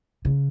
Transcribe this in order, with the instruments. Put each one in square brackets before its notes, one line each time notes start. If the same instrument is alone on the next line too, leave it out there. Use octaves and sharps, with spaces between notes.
[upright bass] C#3